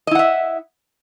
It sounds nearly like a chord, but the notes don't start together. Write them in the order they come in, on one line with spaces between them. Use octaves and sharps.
D#5 E4 F#5 E5